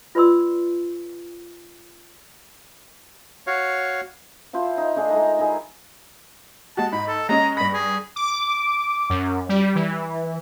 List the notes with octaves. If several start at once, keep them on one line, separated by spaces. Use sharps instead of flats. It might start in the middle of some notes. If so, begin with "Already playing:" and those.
F4 B4 D5 C6 E6
F#4 C#5 F5
F3 E4 F4 C5
D#4
A3 D4 D#4 G#4
G#3 D#4 A#4
A#5
D#3 E4 G#4
G#3 F#4 A5
G#2 B5
A4
G#3 C#4 D#5 A#5
G2 B5 A#6
G#4
D6
F#2
G3
E3